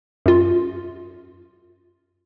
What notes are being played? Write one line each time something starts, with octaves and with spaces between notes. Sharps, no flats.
F#2 F4